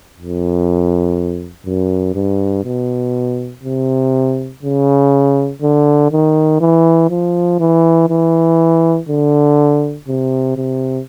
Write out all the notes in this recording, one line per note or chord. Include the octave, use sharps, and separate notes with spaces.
F2
F#2
G2
B2
C3
C#3
D3
D#3
E3
F3
E3
E3
D3
C3
C3